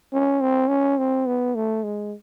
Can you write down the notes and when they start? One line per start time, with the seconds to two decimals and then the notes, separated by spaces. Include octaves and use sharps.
0.13 C#4
0.41 C4
0.69 C#4
0.98 C4
1.26 B3
1.55 A3
1.84 G#3